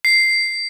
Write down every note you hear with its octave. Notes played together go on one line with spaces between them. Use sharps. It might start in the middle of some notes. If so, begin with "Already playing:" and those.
C7